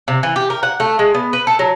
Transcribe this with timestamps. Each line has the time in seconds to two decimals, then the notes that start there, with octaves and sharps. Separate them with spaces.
0.08 C3
0.23 E3
0.36 G4
0.50 A#4
0.63 F#5
0.80 A3
0.99 G#3
1.15 B3
1.33 B4
1.47 A4
1.59 F#3